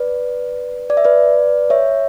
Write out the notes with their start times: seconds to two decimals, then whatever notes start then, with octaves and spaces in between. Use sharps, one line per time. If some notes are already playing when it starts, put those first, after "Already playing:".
Already playing: B4 D5
0.90 D5
0.97 E5
1.05 B4 D5
1.70 C#5 E5